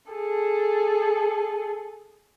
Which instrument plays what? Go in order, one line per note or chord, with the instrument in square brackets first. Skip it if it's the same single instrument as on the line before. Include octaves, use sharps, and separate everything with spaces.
[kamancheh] G#4 A4